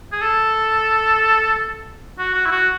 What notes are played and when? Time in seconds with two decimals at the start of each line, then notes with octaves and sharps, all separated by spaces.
0.12 G#4
0.22 A4
2.18 F#4
2.34 F#4
2.46 E4
2.51 F#4